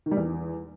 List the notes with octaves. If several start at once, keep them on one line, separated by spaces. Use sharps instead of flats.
D#3
G3
E2